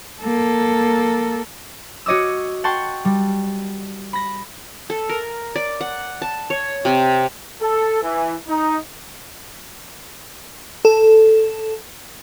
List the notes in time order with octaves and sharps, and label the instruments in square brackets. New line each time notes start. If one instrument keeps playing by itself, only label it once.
[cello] A#3 A4
[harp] F#4 C#5 D#5 D6 E6
F#5 G5 A5 C6 C#6
G3
B5 A#6
[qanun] A4
A#4
D5
F#5
A5
C#5
C3
[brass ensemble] A4
E3
D#4
[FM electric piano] A4